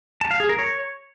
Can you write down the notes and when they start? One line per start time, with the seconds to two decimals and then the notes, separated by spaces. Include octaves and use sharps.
0.21 A5
0.31 F5
0.40 G#4
0.49 A#4
0.59 C#5